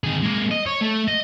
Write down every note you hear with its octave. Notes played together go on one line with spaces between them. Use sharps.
D#3 G#4
G#3 A#3
D#5
C#5
A3
D#5